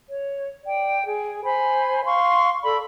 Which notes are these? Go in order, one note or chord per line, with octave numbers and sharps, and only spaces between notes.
C#5
D5 G5
G#4
C5 G#5 B5
F5 C6 C#6
A4 D5 B5